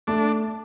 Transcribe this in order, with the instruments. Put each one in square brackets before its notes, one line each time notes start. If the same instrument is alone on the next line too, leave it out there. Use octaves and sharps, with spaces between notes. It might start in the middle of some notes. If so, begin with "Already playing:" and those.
[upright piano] A3 [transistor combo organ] D4